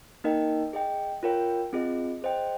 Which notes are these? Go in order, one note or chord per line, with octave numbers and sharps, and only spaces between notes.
A#3 D#4 A#4 D#5 G5
G#4 D#5 G5
F4 A#4 C#5 G5
C4 F4 G#4 D#5
G#4 C5 D#5 G5